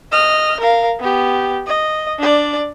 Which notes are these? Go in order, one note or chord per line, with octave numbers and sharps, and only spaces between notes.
D#5 F6
A#4 F5
B3 G4
D#5
D4 D5